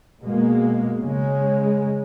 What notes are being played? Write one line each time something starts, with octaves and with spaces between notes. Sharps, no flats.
B2 G#3 A#3
C#3 G#3